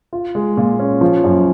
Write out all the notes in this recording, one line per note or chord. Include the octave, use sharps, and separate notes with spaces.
F4
G#3
A#2
C#4
F3
F#2